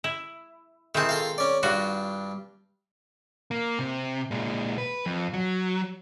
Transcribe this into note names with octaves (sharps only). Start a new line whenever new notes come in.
E4
D#3 G#3 C4 E4 A5
F4 A4 F5
C#4 D5
G2 D4 F4 F#4
A#3
C3
A#2 G#3
B4
F2
F#3